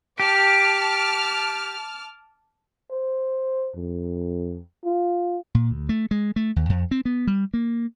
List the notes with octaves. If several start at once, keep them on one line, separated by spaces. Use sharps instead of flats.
G4 A5 D6 F6
C5
F2
F4
A#2
D2
A3
G#3
A3
D#2
F2
C4
B3
G3
A#3